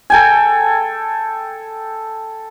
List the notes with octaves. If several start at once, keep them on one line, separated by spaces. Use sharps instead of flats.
A4 G5 G#5